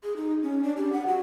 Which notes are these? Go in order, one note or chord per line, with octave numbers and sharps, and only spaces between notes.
G#4
D#4
C#4
D4
G4
F#5
F#4